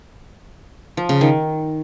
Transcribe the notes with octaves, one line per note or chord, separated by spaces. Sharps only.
F3
C#3
D#3